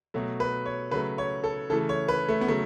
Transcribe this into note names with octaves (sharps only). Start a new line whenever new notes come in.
B2 F#3 A3
B4
C#5
C#3 F#3 A3 B4
C#5
A4
C#3 E3 A3 A4
C#5
B4
A3
B3
C#3 F#3 A3